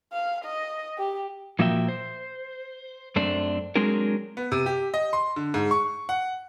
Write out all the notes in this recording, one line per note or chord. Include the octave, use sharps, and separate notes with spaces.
F5
D#5
G4
A#2 F3 A#3 F#4 E5 G5
C5
F#2 A3 C4 D4
F#3 G#3 C4 D4 G#4 A#4
B3
C3
G4
D#5
C6
D3
G#2
C#6
F#5